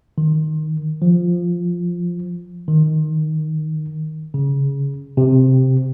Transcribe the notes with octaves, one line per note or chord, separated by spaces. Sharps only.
D#3
F3
D#3
C#3
C3